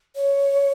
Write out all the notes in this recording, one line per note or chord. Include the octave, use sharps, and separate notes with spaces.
C#5